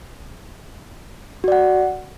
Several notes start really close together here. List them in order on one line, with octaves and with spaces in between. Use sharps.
F#4 D5 F#5